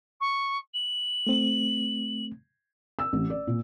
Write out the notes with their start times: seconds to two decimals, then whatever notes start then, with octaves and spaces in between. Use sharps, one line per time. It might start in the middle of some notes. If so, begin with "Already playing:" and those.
0.20 C#6
0.74 F#7
1.27 A3 C4
2.99 E6
3.13 A1
3.30 D5
3.47 A#2